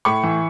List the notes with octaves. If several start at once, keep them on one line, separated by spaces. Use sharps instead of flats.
A2 B5 C#6
E3